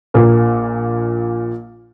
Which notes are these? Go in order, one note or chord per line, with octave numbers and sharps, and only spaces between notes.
A#1 A#2 A#3